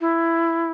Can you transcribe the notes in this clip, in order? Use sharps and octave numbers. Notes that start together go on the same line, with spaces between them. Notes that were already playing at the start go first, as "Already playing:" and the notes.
E4